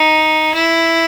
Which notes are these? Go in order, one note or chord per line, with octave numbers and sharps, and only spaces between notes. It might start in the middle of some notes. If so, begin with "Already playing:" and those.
Already playing: D#4
E4